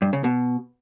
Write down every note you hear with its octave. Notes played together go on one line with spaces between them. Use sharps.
G2
C#3
B2